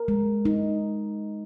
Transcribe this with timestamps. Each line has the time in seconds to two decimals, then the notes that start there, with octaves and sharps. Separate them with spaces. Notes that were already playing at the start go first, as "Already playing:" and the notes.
Already playing: A#4
0.08 G#3
0.45 D#4